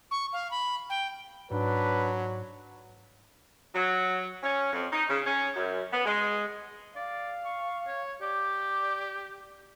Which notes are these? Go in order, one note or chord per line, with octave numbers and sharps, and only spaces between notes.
C#6
F5
B5
G5
G#2 F#3 D4 B4
F#3
C#4
F2
D#4
C#3
C#4
F#2
B3
G#3
D5 F5
C#6
C#5
G4 D5